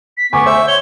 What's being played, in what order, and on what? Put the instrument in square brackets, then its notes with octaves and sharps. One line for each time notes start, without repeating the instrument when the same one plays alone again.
[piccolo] B6
[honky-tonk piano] D2 G#5 D6 [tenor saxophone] B3 [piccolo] C#6
[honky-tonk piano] C5 G6 [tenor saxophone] E5
[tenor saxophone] C#5 [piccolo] G7